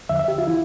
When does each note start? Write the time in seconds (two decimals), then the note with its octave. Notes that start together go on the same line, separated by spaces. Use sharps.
0.09 E2 D3 F3 E5
0.19 E5
0.28 G4
0.38 F4
0.47 E3 E4